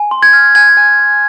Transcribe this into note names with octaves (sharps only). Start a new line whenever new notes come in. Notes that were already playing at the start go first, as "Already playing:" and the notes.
Already playing: G#5
C6
G#6
F6
G#5 G#6
G#5
G#5